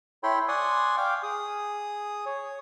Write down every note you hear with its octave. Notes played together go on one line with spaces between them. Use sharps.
E4 A4 C#5 G5 B5 C6
D5 F#5 G#5 C6 C#6 D#6
F5 G5 D6
G#4 D#6
C#5